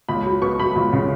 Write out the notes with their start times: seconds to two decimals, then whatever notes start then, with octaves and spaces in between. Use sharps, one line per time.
0.09 C#2 B5
0.25 F#3
0.42 B3 C#6
0.59 F#3 B5
0.76 C#2
0.93 C#3